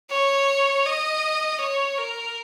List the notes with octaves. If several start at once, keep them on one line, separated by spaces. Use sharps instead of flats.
C#5
D#5
C#5
A#4